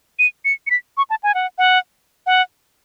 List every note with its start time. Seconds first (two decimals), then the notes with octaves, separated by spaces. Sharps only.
0.19 D#7
0.45 C#7
0.67 C#7
0.71 B6
0.97 C#6
1.10 A5
1.23 G#5
1.34 F#5
1.58 F#5
2.26 F#5